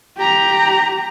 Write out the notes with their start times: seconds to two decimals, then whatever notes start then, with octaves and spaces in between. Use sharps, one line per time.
0.17 G4 A#5